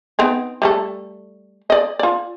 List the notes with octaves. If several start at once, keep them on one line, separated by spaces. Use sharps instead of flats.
B3 C4 D#4
G3 A3 A4
D5 D#5
F4 D5